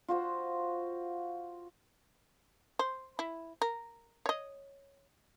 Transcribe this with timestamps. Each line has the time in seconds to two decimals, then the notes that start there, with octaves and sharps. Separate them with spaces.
0.08 F4 F#4 C5 F#5
2.79 C5
3.19 E4
3.62 A#4
4.26 C#5 D#5